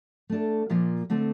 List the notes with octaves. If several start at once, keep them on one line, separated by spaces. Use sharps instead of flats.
A3 D4 A4
A#2 F3 A#3 F4
D3 A3 C4